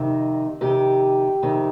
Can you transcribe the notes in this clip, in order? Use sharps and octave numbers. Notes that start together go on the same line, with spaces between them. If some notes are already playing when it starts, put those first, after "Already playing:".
Already playing: F2 C3 D#3 D#4
F2 C3 D#3 G4
F2 C3 D#3